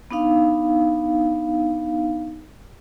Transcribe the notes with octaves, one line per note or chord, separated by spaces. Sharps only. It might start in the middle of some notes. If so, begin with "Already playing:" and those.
B3 D4 D#4 F5